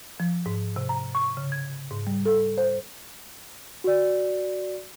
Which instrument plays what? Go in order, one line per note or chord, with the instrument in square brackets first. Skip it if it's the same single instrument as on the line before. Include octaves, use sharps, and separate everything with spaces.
[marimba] F3
G#2
C3
A#5
C#6
C#3
G#6
G#2
G3
A4
C5
[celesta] F#4 D5